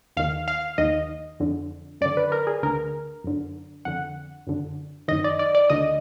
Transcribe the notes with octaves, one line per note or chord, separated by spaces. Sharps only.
D#2 D#3 F5
F5
D#2 D#3 D#5
F2 D3
F#2 D3 D5
B4
A#4
G#4
D2 D3 A#4
F#2 D3
F2 D3 F#5
F#2 D3
F#2 D#3 D#5
D5
D5
D5
D2 D3 D#5